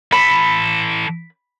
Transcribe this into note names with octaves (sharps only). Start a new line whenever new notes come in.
E3 A4 B5